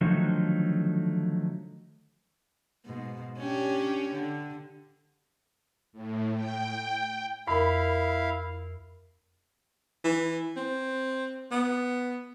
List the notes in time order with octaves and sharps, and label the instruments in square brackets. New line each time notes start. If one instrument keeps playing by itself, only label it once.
[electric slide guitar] D3 D#3 F3 F#3 A3 D#4
[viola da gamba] G#2 B2
C#4 D4 G4
D3
[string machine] A2
G5
[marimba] F2 A#4 [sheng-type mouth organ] E4 F5 [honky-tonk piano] B5
[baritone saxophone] E3
C4
B3